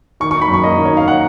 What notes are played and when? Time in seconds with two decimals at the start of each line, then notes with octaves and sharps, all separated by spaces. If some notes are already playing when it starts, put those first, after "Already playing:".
0.20 D#3 C#6
0.31 D#4 C#6
0.42 B5
0.49 F#2 C#6
0.64 A#3 D#5
0.78 D#3
0.85 C#5
0.93 D#4 F5
1.08 F#5